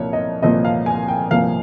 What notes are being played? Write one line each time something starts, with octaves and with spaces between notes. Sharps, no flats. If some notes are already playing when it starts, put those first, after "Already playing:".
Already playing: C2 A#2 F3 A#3 C#5
D#5
C2 A#2 F3 A#3 D#5
F5
G#5
G5
C2 A#2 F3 A#3 F5